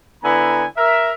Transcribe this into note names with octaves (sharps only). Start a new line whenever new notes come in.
D3 B3 E4 G#5 A#5
A#4 E5